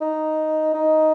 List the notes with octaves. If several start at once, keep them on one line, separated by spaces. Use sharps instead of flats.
D#4
D#4